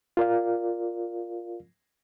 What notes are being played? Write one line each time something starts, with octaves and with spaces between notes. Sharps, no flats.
F4 A#4 D5 F5